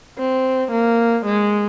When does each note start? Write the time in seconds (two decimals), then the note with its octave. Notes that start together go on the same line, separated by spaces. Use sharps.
0.18 C4
0.71 A#3
1.25 G#3